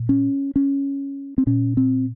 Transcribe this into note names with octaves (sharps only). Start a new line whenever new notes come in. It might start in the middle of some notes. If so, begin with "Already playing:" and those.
Already playing: A#2
C#4
C#4
C4
A#2 C#4
C4